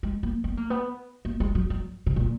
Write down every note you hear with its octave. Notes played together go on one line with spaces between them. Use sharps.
G#3
A#3
B3
A#3
B3
A#3
G#3
F#3
F#3
C#3
A#2